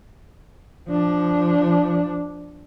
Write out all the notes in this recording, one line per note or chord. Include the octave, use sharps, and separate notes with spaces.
F3 D4